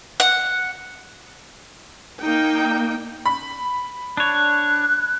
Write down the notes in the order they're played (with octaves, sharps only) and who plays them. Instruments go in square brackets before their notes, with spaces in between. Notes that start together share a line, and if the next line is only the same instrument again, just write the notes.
[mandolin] F#5
[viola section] A#3 D#4 G5
[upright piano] B5
[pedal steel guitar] D4 C#5 [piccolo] F#6